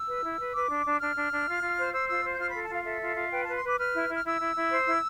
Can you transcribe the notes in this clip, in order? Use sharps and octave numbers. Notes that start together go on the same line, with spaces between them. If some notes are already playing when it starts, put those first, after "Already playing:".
Already playing: E6
B4
E4
B4
B4 D6
D4
D4
D4 F6
D4
D4
F4
F4
C5
C5 E6
F4 E6
C5
G6
F4 F6
A4 B5
A5
F4 F5
A4 E5
F4
F4
B4 G5
B4 A5
C6
B4 D6
B4 F6
E4
E4
F6
E4 E6
E4
E4
C5
E4